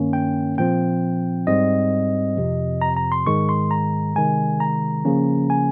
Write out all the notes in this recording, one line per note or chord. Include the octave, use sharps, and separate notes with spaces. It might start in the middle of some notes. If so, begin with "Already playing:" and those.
Already playing: G2 D#3 A#3 C#4
G5
A#2 F3 C4 G5
G#2 G3 C4 D#5
F2 C3 F3
A#5
A#5
C6
G#2 D#3 G#3 C#6
C6
A#5
C3 D#3 G#3 G#5
A#5
C#3 F3 A#3 C#4
G#5